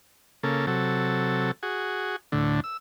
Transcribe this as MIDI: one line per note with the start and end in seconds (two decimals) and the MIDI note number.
0.43 0.66 49
0.43 0.66 58
0.43 0.66 69
0.67 1.51 48
0.67 1.51 54
0.67 1.51 69
1.63 2.16 66
1.63 2.16 68
2.32 2.60 38
2.32 2.60 45
2.32 2.60 50
2.64 2.77 88